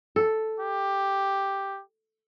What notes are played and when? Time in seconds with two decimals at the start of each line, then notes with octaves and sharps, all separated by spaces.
0.16 A4
0.60 G4